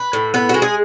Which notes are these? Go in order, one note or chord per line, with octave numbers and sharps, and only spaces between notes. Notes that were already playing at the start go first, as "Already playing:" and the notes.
Already playing: B4
A2
B3 B4
G#3 F#4
G#4